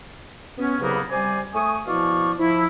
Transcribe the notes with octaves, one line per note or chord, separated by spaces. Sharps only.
B3 C#4
C2 C#3 F#3 A#3 B3 B4
C3 G3 C5 D5 G#5
A3 G#5 C#6 D#6
B2 F3 E4 D5 F5 C#6
F3 E4